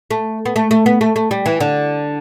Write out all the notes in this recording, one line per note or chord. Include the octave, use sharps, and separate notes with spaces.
A3
B3
A3
A3
B3
A3
A3
G3
E3
D3